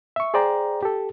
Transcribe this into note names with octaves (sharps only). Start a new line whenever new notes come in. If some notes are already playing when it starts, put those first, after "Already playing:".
E5 C#6
G#4 C5 D5 G5 A#5
G4 A4